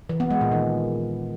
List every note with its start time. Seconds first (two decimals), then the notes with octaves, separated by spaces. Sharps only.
0.09 E3
0.20 B3
0.31 G#3
0.41 A#2
0.52 D#3